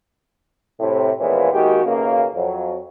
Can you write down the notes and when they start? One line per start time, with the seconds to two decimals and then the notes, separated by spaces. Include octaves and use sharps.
0.80 A2 C3
1.19 A#2 E3 F3 G#3 B3 C#4
1.53 D#3 G#3 A#3 F#4 G4
1.84 B1 F#2 C#3 A#3
2.35 F2 F#3